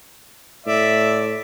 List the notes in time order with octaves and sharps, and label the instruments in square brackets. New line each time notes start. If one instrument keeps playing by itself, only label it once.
[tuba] A2 [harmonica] D5 E5